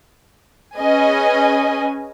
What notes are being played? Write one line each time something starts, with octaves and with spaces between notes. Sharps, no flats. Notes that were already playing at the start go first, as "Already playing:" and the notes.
C#4 G#4 B4 D#5 G#5